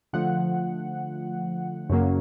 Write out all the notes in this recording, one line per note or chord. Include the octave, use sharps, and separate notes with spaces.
D3 F3 A3 F#5
F#2 C#3 F#3 A#3